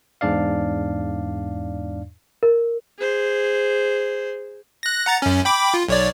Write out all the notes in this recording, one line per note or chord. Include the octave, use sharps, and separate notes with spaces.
E2 G#2 D4 D5 F5
A#4
G#4 C5
F#6 A#6
F#5 A#5 A6
F#2 C#4
G5 B5 D6
F4
B1 C#5 D5